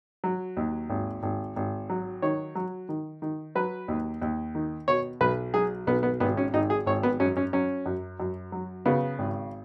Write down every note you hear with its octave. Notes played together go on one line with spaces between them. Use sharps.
F#3
D#2
G#1
G#1
G#1
F#3
D#3 C#5
F#3
D#3
D#3
F#3 B4
D#2
D#2
D#3
B2 C#5
B1 B4
F#3 G#4
B1 B3
B3
G#1 B3
C#4
G#1 D#4
G#4
G#1 C#5
B3
F#2 C#4
C#4
F#3 C#4
F#2
F#2
F#3
C#3 B3
G#1